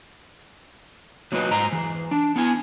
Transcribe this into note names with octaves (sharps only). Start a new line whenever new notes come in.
F#3 A#3 F4 B4 D#5
G#2 C5 A#5
E3 G#4
D4
B3 E4 G#5